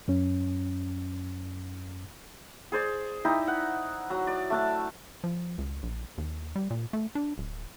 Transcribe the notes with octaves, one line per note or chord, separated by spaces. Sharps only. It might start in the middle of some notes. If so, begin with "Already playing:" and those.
F#2 C#4
G#4 C5 D5
D#4 E4 G4 D5
F#5
F#3 A#5
D5
A3 D4 A5
F3
C#2
A#1
D#2
G3
A#2
A3
D4
D1